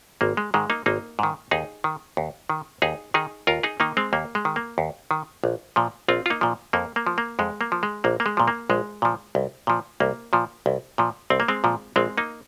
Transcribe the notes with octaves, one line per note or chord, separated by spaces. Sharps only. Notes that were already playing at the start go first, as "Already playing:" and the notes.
G#1 A#3
G#3
G#2 D#3 G#3
A#3 D#4
G#1 A#3 D#4
G#2 D#3
D#2 D#4 G#4
D#3
D#2
D#3
D#2 D#4 G#4
D#3 D#4 G#4
D#2 F4 A#4
D#4 G#4
D#3 A#3 D#4
G#3 C4
D#2 A#3
G#3
D#3
A#3
D#2
D#3
A#1
A#2 F3
A#1 C4 F4
F4
A#3 D#4
A#2 F3
F2 A#3
A#3
F3
A#3
F2 G#3
A#3
F3
G#3
A#1 A#3
A#3
G#3
A#2 F3
A#3
A#1 G#3
A#2 F3
C2
A#2 F3
C2 A#3
A#2 F3
C2
A#2 F3
C2 C4
A#3
G#3 C4
A#2 F3
A#1 G#3 C4
A#3 D#4